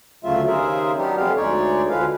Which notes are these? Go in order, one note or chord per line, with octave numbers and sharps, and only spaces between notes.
D2 C#3 F#3 A3 F4 E5
D#2 C#3 G#4 A#4 C5 E5
F#3 B3 D4 D#4 G4
F2 C3 G#3 B3 G4 F5
D2 G#3 D#4 C#5 D5
D2 D3 F3 G#3 B4 F5